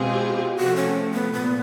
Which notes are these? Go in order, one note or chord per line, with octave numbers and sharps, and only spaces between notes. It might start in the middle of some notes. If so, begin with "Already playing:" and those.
Already playing: B2 G#3 C4 F4 G4 G#4
C3 F3 A3 F#4
C#4
B3
A#2 B3